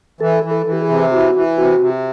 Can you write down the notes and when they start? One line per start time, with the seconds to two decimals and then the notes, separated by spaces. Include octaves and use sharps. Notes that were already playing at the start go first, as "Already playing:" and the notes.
0.20 E3 A4
0.43 E3
0.51 A4
0.66 E3
0.72 G4
0.82 G#4
0.89 C3
1.12 E3 F#4
1.35 E3
1.58 C3 F#4
1.80 C3